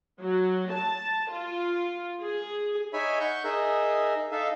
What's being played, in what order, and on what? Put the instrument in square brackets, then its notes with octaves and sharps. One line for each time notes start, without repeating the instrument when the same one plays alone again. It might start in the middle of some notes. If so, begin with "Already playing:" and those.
[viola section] F#3
A5
F4
G#4
[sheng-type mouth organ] D#4 C#5 E5 G#5 B5
F#5 C#6 G6
D#4 G#4 A#4 E5
D#4 A4 E5 F5